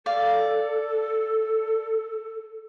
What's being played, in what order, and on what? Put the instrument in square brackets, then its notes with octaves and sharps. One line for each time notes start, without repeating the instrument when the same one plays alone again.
[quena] A4 [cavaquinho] D5 F5